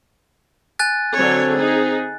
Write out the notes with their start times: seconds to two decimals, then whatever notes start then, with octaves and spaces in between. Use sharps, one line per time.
0.79 G#5 F#6 A6
1.17 D3 F#3 C4 C#5
1.56 D#4 G#4